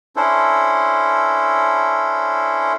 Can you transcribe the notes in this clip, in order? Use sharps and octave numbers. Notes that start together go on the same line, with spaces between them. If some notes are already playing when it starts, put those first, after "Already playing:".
C#4 D4 E4 A4 C5